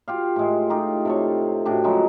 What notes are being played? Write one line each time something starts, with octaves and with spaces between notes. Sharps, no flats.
F4 G4 F5
A2 G#3
D#4 F4 G4
C3 A4 C#5
A2 D4 F#4 G4
C#3 F3 F#3 G#3